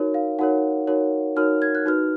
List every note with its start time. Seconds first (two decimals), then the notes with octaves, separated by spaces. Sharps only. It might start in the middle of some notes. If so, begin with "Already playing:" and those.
Already playing: D#4 F#4 A#4 C#5
0.14 F5
0.39 D#4 F#4 A#4 C#5 F#5
0.87 D#4 F#4 A#4 C#5
1.36 D#4 F#4 A#4 C#5 F6
1.62 G#6
1.75 F#6
1.86 D#4 F#4 B4 F6